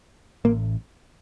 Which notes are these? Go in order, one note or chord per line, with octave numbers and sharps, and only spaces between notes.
A1 A2 A#3